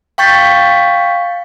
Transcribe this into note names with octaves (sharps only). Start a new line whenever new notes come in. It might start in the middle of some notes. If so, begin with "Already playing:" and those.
F5 G5 C#6 G6 A6 B6